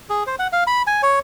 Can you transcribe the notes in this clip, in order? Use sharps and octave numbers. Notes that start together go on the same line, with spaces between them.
G#4
C5
F#5
F5
B5
G#5
C#5